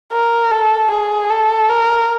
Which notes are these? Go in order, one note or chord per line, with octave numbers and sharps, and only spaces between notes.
A#4
A4
G#4
A4
A#4